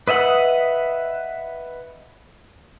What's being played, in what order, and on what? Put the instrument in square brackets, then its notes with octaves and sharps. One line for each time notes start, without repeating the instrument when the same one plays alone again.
[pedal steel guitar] B4 D#5 E5 F#5